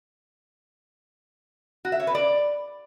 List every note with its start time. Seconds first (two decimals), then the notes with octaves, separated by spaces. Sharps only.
1.85 F#4
1.92 E5
2.00 C#5
2.07 B4
2.15 D5